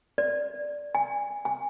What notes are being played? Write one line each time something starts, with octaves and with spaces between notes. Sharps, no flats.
D5
G#5
G#5